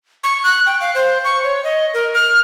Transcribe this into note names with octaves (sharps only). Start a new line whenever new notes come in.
C#6
F#6
G5
F5
C5
C#6
C#5
D#5
A#4
F6